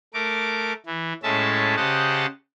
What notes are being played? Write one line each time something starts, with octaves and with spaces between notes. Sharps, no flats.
A3 A#4 D6
E3
A2 G#3 C#4 E5 A5
C#3 G4 C5 D#5 F#5 A5